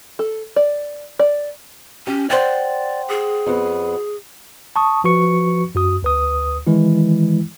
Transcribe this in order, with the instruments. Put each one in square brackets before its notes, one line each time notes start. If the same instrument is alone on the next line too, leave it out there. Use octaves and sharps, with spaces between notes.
[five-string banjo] A4
D5
D5
[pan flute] C#4 [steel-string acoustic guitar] G4
[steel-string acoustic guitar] C5 F#5 G5 [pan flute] D5
[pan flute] G#4
[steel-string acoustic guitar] F2 B3
[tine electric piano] A5 C#6 D#6
F3 F#4 B4 C#6 C#7
F#2 F#4 D#6
D2 B4 D#6
D#3 E3 G#3 E4